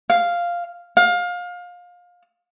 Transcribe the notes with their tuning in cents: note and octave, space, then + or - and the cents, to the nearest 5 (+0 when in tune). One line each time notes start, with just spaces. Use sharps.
F5 -5
F5 +25